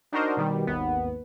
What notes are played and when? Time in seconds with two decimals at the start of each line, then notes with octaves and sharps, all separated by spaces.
0.12 D4 D#4 F#4 A#4 C5 D#5
0.37 B2 D#3 G3
0.67 G#1 D#2 B3